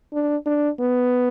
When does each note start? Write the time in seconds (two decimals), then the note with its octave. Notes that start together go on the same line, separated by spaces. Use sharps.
0.13 D4
0.46 D4
0.79 B3